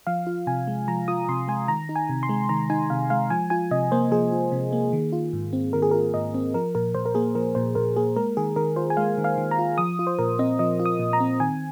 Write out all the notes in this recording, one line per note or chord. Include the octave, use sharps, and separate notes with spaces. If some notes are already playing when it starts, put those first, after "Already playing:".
F3 F5
F4
C3 G#5
G#3
F3 A#5
F4 D#6
C3 C6
G#3 G#5
D#3 A#5
D#4
G#5
C3
C6
G#3
D#3 A#5
D#4 G#5
C3 F5
G#3 F5
F3 G#5
F4 G#5
C3 D#5
A#3 C5
F3 G#4
F4
C3
A#3
D#3
F4
G#2
C4
D#3 A#4
G#4
F4 A#4
G#2 D#5
C4
F3 A#4
A#2 A#4
A#2 C5
A#4
A#3 G#4
F3 A#4
A#2 C5
A#2 A#4
A#3 G#4
G#3 A#4
D#3 G#4
D#3 A#4
F4 C5
G#5
G#3 F5
D#3
F5
D#3
A#5
F4
F3 D#6
F4
C5
A#2 A#4
C4 D#5
F3 D#5
F4
D#6
A#2
A#5
C4
D#3 G#5